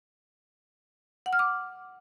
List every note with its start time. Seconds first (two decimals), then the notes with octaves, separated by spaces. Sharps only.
1.26 F#5
1.33 F6
1.39 D6